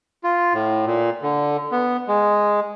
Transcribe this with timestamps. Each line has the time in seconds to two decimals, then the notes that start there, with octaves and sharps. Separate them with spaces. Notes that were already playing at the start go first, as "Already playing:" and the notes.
0.24 F4
0.54 A2
0.87 A#2
1.22 D3
1.72 B3
2.08 G#3